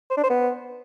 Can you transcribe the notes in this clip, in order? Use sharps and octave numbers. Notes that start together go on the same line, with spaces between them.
C5
D4
C5
B3